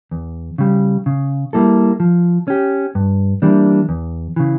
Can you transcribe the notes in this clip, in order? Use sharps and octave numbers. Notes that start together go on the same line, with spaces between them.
E2
C#3 G3
C#3
G3 A#3 E4 A4
F3
C#4 G4
G2
E3 G3 A#3 D4
E2
C#3 E3